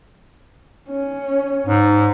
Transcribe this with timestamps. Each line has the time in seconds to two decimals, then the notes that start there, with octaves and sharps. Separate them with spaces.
0.90 C#4
1.67 G#2